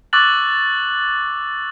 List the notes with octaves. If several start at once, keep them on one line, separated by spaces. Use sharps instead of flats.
C#6 D6 E6 F#6 A6 F#7